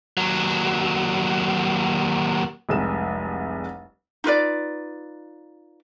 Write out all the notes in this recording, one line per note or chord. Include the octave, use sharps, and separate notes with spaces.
D#2 F#3
F1 C2 G#3 E7
D#4 F4 B4 D5